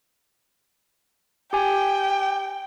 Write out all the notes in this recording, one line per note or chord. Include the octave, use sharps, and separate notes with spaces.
G4 G5 G#5